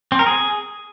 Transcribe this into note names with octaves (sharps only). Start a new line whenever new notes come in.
C4
A#4
G#4